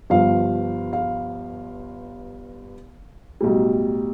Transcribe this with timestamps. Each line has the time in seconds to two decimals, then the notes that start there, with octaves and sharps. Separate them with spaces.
0.10 G1 G2 F3 F5
0.93 F5
3.41 B1 A2 G3